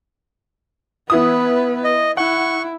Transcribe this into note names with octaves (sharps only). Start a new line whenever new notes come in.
E3 B3 E4 B4 D#6
D#5
E4 F#5 C#6